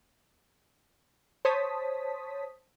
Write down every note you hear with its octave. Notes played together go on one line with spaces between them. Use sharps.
C5 C#5 A5 D#6 B6